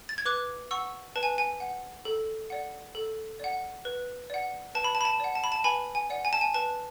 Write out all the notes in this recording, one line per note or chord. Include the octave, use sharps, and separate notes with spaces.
A6
G#6
B4 D6 F#6
F#5 C#6 E6
B4 A5
G#5
G#5
F#5
A4
D5 F#5
A4
D5 F#5
B4
D5 F#5
B4 A5
B5
A5
B5
A5
D5 F#5
A5
B5
A5
B4 G#5 B5
G#5
D5 F#5
G#5
A5
G#5
B4 A5